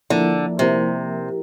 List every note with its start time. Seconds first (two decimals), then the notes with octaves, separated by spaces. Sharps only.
0.10 D3 F3 A#3 E4 A#4
0.59 C3 F3 A#3 E4 A#4